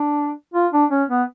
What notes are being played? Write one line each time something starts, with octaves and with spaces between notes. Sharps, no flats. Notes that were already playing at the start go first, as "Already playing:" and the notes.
Already playing: D4
F4
D4
C#4
B3